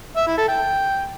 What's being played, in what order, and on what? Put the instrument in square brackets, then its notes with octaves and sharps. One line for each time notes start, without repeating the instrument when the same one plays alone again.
[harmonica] E5
E4
A4
G5